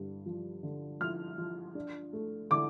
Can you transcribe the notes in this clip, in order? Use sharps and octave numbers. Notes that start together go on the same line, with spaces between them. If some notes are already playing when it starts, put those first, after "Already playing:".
Already playing: G2 D3
F3
D3
F3 F6
F3
D4
A3
D3 D6